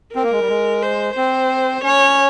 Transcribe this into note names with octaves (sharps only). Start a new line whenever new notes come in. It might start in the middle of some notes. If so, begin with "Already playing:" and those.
C4 A#4
A#3
G#3
G3
G#3
C5
C4 C5
C#4 C#5